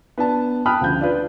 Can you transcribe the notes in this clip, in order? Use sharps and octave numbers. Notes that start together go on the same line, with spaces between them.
B3 D4 A5
G5 A5 B5 D#6 F6 F#6
D2 C#3 F3 G6
D4 F4 B4